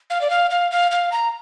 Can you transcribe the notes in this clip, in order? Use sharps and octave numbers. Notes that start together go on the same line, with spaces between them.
F5
D5
F5
F5
F5
F5
A#5